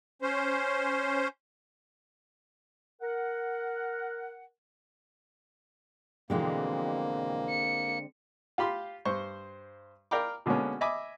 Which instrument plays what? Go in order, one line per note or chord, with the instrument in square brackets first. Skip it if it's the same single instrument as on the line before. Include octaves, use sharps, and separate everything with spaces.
[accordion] C#4 C5
[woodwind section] A#4 F#5
[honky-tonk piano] F2 B2 E3 [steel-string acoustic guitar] D3 G#3 C4 [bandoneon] A#3
[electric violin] C#7
[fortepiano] F4 G4 B5 C6
G2 C5 C#6
A#4 D5 F5 G5 B5 D6
B2 D3 G#3 A#3 B3 C#4
D#5 E5 G#5 B5 D6